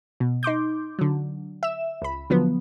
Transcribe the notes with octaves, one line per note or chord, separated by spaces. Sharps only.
B2
D#4 C6 D6 G6
D3 F#3
E5 E7
C#2 B5
D3 F3 F#3 B3